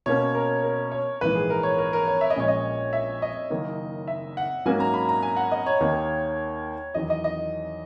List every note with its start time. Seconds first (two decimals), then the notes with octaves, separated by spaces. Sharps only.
0.06 B2 A#3 C#4 C#5
0.35 A#4
0.63 A#4
0.92 C#5
1.21 A#1 G#2 E3 A#3 B4
1.35 G#4
1.50 A#4
1.63 C#5
1.78 A#4
1.93 A#4
2.08 C#5
2.21 E5
2.30 D#5
2.36 A#1 A#2 G#3 C#4 C#5
2.48 D#5
2.93 E5
3.22 D#5
3.50 F#1 F#2 D#3 A#3
4.08 E5
4.37 F#5
4.65 G#2 F#3 A#3 C#4 F#4 G#5
4.80 A#5
4.94 B5
5.09 A#5
5.23 G#5
5.37 F#5
5.52 D#5
5.66 C#5
5.80 D#2 D#3 A#3
6.94 E2 D#3 F#3 D#5
7.10 D#5
7.24 D#5